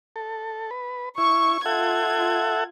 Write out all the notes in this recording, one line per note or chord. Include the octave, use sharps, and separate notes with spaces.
A4
B4
E4 C#6
F4 A4 E5 F#5 G#6